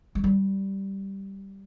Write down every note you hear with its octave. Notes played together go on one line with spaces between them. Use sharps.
G#3
G3